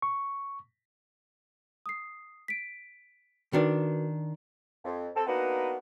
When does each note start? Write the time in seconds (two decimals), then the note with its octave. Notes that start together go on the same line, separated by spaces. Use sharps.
0.02 C#6
1.86 D#6 C7
2.48 B6 D7
3.53 D#3 D4 F#4 A#4 B4 D5
4.85 F2
5.16 C4 A4
5.27 A#3 B3 D4 D#4 F#4 B4